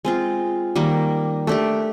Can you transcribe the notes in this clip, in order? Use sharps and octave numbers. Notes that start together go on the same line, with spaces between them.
G#3 C4 F4
D#3 G3 A#3
A3 D4 G4